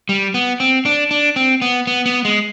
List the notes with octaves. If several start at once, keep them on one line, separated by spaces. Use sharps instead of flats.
G3
B3
C4
D4
D4
C4
B3
B3
B3
G#3